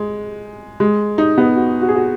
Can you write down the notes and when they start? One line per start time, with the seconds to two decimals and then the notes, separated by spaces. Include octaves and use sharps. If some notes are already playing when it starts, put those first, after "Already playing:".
Already playing: G#3
0.80 G#3
1.18 D#4
1.38 B3
1.56 F#4
1.82 F#4
1.89 G#4
1.95 F#4